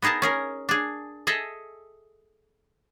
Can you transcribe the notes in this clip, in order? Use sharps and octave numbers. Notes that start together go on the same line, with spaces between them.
B3 D#4 G#4 A#4 A5
C#4 G#4 A#4
D4 G#4
G#4 A4 D#5 E5